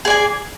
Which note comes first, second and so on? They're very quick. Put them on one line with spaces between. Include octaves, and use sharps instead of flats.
G#4 D5 G#5